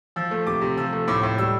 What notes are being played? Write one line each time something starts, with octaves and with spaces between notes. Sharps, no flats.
F3 E6
A3
C3 D6
C3
F3 E6
A3
A2 D6
A2
G3 E6